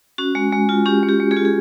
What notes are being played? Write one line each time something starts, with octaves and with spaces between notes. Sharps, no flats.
C#4 F#4
G#3
G#3
F4
C#4 G4
G#3
G4
G#3
G#3 G#4
F4
G#4